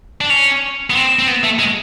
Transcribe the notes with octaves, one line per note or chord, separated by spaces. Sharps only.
D4
C#4
B3
C4
C4
B3
A3
G#3